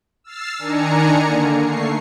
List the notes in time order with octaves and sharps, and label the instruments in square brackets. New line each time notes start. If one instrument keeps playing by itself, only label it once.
[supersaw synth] E6 F6 A6 C7
D#3 D4 G#5 A#5 C#7
D3 A#3
A3 C#6 C7